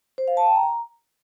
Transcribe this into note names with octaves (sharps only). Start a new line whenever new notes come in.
C5
F5
A5
G5
A#5